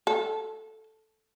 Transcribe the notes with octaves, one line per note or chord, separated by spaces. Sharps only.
A4